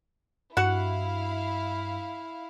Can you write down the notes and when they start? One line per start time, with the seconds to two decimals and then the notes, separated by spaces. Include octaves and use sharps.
0.57 G2 E4 F#4 F5 F#5